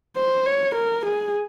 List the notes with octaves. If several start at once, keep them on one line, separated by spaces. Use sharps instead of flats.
C5
C#5
A#4
G#4